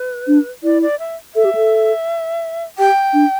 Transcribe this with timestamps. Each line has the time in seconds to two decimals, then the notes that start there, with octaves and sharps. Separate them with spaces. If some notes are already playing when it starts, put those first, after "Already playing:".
Already playing: B4
0.27 D4
0.64 E4 D5
0.82 D5
0.99 E5
1.35 A4 E5
1.45 G4
1.55 A4
2.78 G4 G5
3.13 D4